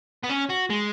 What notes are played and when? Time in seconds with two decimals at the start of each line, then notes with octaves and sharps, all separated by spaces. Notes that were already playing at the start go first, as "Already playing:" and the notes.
0.24 B3
0.30 C#4
0.50 F#4
0.70 G#3